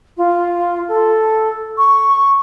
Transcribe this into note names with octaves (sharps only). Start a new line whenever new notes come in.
F4
A4
C#6